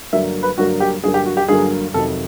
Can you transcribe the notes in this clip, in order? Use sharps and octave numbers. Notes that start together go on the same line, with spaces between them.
G2 D3 F#3 A#3 E5
B4
G2 D3 F#3 A#3 F#4
G4
G2 D3 F#3 A#3 G#4
G4
F#4
G4
G2 D3 F#3 A#3 G#4
F2 C3 D#3 F#3 A4